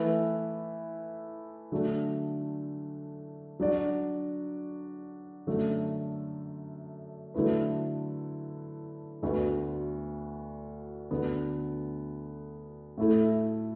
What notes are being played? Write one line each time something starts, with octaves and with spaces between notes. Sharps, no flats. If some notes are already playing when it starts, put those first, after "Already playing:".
Already playing: E3 A3 E4 B4 E5
D3 F#3 A3 D4
F#3 D4 F#4 D5
F#2 D3 A3
D3 F#3 A3 E4 B4
D2 D3 B3 F#4 B4
D2 D3 B3
A2 A3 E4 A4